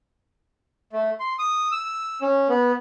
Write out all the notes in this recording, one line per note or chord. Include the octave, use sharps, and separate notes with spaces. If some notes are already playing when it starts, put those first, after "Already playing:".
A3
C6
D#6
E6
C#4
B3